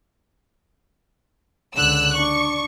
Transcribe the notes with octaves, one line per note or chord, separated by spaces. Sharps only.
C#2 D3 E6 F#6
D4 C#6